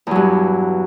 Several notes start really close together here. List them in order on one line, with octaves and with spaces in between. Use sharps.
E2 F#3 G2